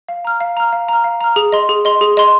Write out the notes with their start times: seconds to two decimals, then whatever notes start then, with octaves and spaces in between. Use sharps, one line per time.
0.09 F5
0.25 A#5 F6
0.41 F5
0.57 A#5 F6
0.73 F5
0.88 A#5 F6
1.04 F5
1.21 A#5 F6
1.36 G#4
1.52 D#5 C6
1.69 G#4
1.85 D#5 C6
2.01 G#4
2.17 D#5 C6